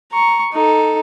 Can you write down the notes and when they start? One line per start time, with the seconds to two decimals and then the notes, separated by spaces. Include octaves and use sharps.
0.12 A#5 C#6
0.52 D#4 A4